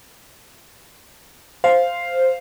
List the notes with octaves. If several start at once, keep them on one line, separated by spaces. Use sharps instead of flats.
C5 F5